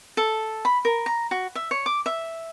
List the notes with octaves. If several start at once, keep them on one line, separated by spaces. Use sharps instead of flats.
A4
B5
A#4
A#5
F#4
E5
C#5
D6
E5